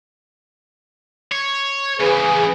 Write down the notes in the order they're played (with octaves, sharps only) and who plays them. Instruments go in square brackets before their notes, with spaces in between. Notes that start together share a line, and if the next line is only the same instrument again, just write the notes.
[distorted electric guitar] C#5
[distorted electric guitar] C#3 E3 [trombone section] G#4 B4